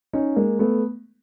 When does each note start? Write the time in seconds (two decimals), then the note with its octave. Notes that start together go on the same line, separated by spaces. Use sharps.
0.13 C#4 D#4
0.36 G#3 A#3
0.59 A3 B3